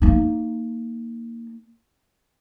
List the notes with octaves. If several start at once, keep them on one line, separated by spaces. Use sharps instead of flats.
A#3 D#4